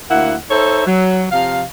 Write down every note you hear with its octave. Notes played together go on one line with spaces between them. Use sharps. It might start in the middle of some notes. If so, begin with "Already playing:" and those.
D2 A#3 E4 F#5
D#4 A4 C5 C#5 E5
F#3
C3 F3 F5